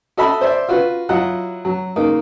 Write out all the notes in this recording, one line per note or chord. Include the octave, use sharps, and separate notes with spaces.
F#4 A4 D#5 E5 A5 B5
C5 D5 E5
F4 F#4 B4
F#3 E4 F4 D#5 F#5
F#3
C#3 A#3 D#4